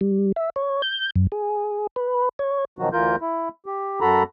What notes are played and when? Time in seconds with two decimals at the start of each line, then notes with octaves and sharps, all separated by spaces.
0.01 G3
0.36 E5
0.56 C#5
0.82 G6
1.16 F#2
1.32 G#4
1.96 B4
2.39 C#5
2.79 B2 D#3 F3 F#3 F#4
2.93 D2 E3 F4 A#4 G6
3.21 E4
3.66 G4
4.01 F#2 F#4 A4 A#5 B5